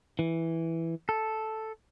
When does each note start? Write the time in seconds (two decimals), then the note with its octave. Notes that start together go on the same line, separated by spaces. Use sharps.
0.19 E3
1.09 A4